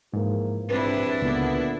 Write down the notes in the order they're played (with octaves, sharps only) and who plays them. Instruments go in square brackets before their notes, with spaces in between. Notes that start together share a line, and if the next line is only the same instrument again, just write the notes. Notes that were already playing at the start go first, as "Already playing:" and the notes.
[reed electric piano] G#2 [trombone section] E3 F3 A#3
[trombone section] A#1 C4 [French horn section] C3 B4 [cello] D4 E4
[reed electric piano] C#2 [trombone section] A#2 D3 [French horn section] B3